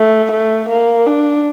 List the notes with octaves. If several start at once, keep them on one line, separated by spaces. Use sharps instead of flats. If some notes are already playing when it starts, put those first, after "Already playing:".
Already playing: A3
A3
A#3
D4